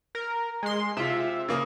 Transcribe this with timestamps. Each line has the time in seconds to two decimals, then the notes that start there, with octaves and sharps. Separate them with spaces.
0.15 A#4
0.63 G#3 C6
0.97 C3 F4 E5
1.49 C#3 A#3 D#6